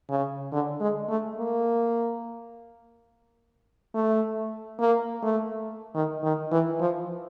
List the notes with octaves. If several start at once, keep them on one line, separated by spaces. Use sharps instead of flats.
C#3
D3
G#3
A3
A#3
A3
A#3
A3
D#3
D#3
E3
F3